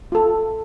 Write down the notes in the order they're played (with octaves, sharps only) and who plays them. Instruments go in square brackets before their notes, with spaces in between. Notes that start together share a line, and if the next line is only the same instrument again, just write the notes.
[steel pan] F4 A4